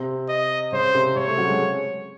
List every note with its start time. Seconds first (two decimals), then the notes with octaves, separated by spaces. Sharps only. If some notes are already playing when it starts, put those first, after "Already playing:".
Already playing: C3 C4
0.29 D#5
0.72 C#3 C#4 C5
0.94 C3 C4
1.16 C#3 C#4 C#5
1.27 A3 A4
1.38 F#3 F#4
1.49 G#3 G#4